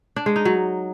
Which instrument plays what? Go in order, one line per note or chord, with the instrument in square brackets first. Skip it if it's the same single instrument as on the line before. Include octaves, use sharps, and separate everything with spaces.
[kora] D4
G#3
D#4
F#3